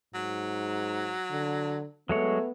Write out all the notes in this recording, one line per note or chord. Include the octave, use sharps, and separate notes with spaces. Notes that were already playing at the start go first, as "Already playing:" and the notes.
G#2 F#3
D3
F#3 G#3 A3 B3 C#5